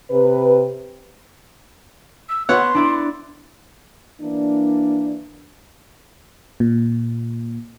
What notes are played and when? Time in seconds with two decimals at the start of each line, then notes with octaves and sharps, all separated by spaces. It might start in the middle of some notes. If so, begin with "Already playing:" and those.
0.11 C3 B4
2.28 E6
2.49 B3 C#5 F#5 C6
2.75 D4 E4 D5
4.21 E3 A#3 D4
6.60 A#2